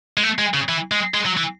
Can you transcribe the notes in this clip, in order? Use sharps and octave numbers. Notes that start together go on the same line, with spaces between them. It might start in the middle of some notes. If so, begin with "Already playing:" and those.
G#3
A3
G#3
C#3
E3
G#3
G#3
F#3
E3